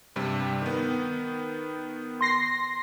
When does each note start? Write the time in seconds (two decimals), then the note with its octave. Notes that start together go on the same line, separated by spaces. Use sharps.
0.16 G2 C3 G3
0.62 D#3 B3
2.21 C6 A#6 C7